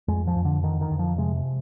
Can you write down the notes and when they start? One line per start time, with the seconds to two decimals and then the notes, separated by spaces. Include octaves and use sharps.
0.08 F2 G#3
0.27 F3
0.36 F2
0.45 D3
0.63 D3 D#3
0.81 D#3
0.91 F2
0.99 F3
1.18 C3 G#3